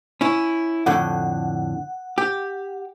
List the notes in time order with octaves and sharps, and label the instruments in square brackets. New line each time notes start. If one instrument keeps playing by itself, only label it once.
[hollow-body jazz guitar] C#4 E4
[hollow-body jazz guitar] F2 A2 D3 [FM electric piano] F#5
[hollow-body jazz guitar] G4